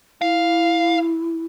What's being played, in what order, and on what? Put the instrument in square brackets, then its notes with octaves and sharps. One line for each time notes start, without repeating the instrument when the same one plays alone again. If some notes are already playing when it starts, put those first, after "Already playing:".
[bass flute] E4 [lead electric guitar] F5